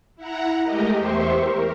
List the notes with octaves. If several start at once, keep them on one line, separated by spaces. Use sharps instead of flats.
E4 F#5 A#5
G#3 A3 G4 A#4 D#5
E2 G4 C5 E5 C6 C#6
A#4